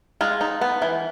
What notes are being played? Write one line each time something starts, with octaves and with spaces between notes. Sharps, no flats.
G#3 F4
D#4
B3
E3